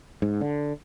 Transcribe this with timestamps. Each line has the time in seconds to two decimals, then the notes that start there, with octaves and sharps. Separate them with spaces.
0.22 G#2
0.41 D3